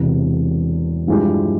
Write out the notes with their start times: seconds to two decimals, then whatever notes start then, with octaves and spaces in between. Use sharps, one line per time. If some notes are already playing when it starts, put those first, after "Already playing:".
Already playing: E1 E2 C3
1.07 G2 F3 G#3 E4 G4